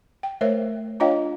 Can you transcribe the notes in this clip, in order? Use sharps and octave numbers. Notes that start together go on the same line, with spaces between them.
G5
A3 A#4 C5 C#5 E5
D4 F4 C#5 D#5 F5 G5